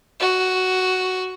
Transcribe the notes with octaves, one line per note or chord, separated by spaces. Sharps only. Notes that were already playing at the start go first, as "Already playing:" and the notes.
F#4